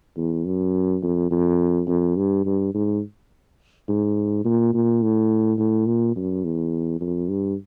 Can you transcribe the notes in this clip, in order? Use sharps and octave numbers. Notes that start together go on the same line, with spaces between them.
E2
F#2
F2
F2
F2
G2
G2
G#2
G#2
A#2
A#2
A2
A2
A#2
F#2
E2
F2
G2